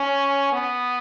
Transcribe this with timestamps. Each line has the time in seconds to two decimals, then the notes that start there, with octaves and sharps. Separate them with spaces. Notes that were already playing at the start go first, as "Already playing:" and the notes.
Already playing: C#4
0.52 B3